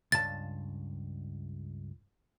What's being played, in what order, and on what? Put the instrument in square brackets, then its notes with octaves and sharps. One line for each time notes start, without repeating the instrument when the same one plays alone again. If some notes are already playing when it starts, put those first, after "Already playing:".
[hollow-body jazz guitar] C#2 G2 A5 [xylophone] A6